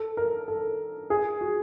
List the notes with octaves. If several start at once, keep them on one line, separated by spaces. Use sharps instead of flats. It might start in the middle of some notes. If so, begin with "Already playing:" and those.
Already playing: A4
A#4
A4
G#4
F#4